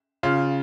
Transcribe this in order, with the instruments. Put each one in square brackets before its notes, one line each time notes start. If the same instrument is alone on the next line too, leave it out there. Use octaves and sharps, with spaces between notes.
[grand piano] C#3 F4